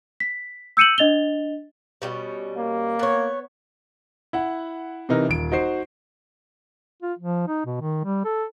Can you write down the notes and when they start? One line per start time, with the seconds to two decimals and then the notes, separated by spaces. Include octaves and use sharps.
0.20 B6
0.77 E6 G6 C#7 D#7 E7 F#7
0.98 D4 D#5 A6 F7 G7
2.02 B2 G3 C#4
2.57 A#3
2.99 B3 C#5
4.33 E4 F#5
5.09 C3 E3 D#4 A#4
5.29 D#1 D7
5.52 D#4 F#4 C5 C7
7.03 F4
7.19 F3
7.48 D#4
7.66 B2
7.81 D#3
8.05 G3
8.25 A4